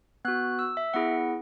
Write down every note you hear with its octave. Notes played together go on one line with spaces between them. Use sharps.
B3 F#4 F#6
E6
E5
B3 E4 G#4 F#5